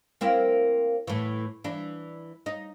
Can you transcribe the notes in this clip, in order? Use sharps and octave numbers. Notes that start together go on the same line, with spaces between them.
A#3 C4 E4
A2 E3
E3 D4
D#4